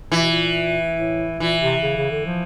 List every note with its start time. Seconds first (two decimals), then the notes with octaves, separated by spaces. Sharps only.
0.12 A#2 E3
0.21 B2
0.30 A#2
0.96 A2
1.40 A#2 E3
1.61 C3
1.83 C#3
1.97 C#3
2.11 D3
2.26 F3